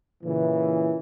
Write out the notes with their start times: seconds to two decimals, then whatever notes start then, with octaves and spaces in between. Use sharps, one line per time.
0.24 A#2 C#3 E3